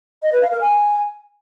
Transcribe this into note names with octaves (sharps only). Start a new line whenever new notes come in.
D#5
B4
F5
A#4
G#5